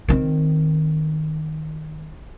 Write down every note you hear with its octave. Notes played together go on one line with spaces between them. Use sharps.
D#3 C4